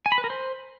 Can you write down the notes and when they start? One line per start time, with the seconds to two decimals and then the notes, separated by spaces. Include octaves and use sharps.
0.06 G#5
0.12 B5
0.18 B4
0.24 A#4
0.30 C5